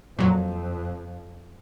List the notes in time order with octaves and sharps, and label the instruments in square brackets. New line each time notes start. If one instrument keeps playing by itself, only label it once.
[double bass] F2 [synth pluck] A#2 F#3